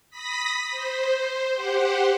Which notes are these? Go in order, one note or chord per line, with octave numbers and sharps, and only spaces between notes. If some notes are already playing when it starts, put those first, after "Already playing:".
B5 D#6 A#6 B6
C5
G4 C5 F#5